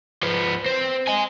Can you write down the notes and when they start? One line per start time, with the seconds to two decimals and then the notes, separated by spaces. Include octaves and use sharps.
0.23 F3 B3
0.66 C4
1.08 D#5 G#5